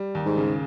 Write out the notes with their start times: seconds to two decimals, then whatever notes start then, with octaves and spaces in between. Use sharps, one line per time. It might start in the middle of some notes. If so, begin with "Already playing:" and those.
Already playing: G3
0.15 D#2
0.26 G#2
0.37 C#3